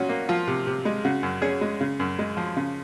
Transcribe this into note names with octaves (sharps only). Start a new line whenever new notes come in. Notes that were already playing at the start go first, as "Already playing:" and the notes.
Already playing: A#2 C#4 F#4
A#3
F3 F4
C3
C3
G#3
C#3 F#4
F#2
C#4 G#4
G#3
C#3
F#2
G#3
F3
C#3